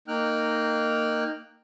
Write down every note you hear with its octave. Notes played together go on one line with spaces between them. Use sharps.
A#3 D#4 G5 F6 F#6